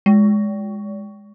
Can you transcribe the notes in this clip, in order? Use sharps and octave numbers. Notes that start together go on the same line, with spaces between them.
G#3